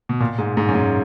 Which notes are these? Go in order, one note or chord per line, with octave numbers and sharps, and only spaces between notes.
B2
A#2
G#2
G#2
F#2
G#2